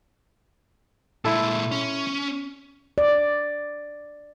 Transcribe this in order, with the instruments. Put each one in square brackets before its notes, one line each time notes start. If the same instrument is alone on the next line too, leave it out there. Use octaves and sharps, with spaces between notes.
[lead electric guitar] A#2 G#3 [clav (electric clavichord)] E4 A4
[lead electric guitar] C#4
[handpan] D5